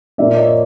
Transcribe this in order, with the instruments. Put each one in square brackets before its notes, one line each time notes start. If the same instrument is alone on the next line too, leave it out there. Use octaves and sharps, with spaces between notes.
[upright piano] A#2 F3 A#3 D5 E5
C#5 D#5